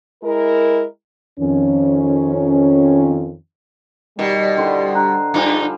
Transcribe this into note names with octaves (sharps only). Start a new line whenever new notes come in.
G#3 E4 A#4
F2 D#3 C#4
B2 D#3 G3 G4
D3 E4 C5 C6
D4 A#5 F#6
G2 F3 G3 D#4 G#5